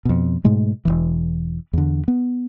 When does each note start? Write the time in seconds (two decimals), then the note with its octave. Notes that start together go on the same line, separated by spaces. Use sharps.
0.05 F2 B2
0.44 G#2 B2 G#3 A3
0.85 E1 A#1 E3
1.73 E2 D3
2.08 B3